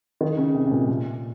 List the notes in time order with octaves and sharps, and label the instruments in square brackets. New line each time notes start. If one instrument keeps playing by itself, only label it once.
[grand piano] D#3
C#3
C3
C3
A#2
A#2